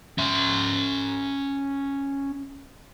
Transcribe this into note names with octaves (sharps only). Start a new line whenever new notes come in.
C#4 E5